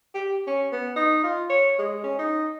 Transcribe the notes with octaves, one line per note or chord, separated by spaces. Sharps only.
G4
C#4
B3
D#4
F4
C#5
G#3
C#4
D#4